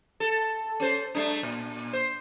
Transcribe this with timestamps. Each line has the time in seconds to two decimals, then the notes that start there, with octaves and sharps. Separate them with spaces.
0.20 A4
0.80 C#4 A4 C5
1.15 G3 A3 D4
1.43 A#2
1.93 C5